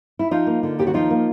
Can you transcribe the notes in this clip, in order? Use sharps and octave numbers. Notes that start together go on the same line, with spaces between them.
E4
F3 D#4 F4
A#3
D3
D#2 G4
F#4
F3 D#4 F4
A#3